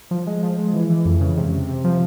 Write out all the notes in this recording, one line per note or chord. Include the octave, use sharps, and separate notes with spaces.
F3
G#3
F3
G#3
E3
E3
F2
C#3
C3
C3
C3
F3